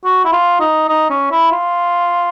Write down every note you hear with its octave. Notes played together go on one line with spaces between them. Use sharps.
F#4
E4
F4
D#4
D#4
C#4
E4
F4